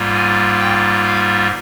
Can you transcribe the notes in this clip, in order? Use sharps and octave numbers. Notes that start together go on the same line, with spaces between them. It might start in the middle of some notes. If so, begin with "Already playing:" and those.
Already playing: G#2 G3 A#3 F4
G#5
G5
F5